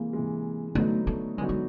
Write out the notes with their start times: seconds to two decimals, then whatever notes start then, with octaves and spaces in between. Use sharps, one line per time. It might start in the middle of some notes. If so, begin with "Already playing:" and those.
Already playing: C3 E3 G#3 A#3
0.13 C3 E3 G#3
0.75 D3 F#3 A3 B3 D#4 F#4
1.07 A3
1.38 D3 F#3 G#3 B3 D#4 F#4
1.49 G#3